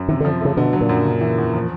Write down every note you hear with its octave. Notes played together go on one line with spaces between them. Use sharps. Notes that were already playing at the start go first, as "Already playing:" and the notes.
Already playing: F#2
C3 D#3
D3
F3
C#3 A3
B2 D3
F#3
A#2
F#2
C#3
E3
E2
F3